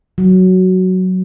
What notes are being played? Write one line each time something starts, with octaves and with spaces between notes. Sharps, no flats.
F#3